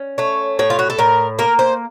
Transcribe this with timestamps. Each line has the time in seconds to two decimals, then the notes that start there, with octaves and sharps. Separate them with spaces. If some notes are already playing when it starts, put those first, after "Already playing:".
Already playing: C#4
0.18 A3 C#5
0.59 A2 C#5
0.70 F4
0.79 F#4
0.90 A4
0.99 A2 A#4
1.39 A#3 A#4
1.59 C5